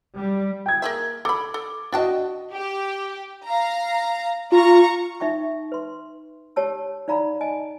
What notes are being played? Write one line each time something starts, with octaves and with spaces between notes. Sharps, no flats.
G3
G5 G#6
A#3 G#4 E5
A4 B5 D6
A4
D4 F#4 D#5 G5 A5
G4
F5 A#5
F4 A#5 C#6
D#4 E5 G5 C#6
B4 C6
G4 C#5 A5 E6
D#4 D5 F5 A#5 B5
D#5 G#5 A5